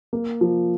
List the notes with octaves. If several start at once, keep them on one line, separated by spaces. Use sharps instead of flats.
A#3
F3